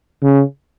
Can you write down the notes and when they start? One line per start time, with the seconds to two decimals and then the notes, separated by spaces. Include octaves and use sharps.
0.23 C#3